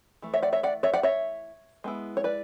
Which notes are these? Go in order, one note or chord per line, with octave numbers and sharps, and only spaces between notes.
E3 A3
C#5 E5
D5 F#5
C#5 E5
D5 F#5
C#5 E5
D5 F#5
C#5 E5
G#3 B3 E4
C#5
B4 D5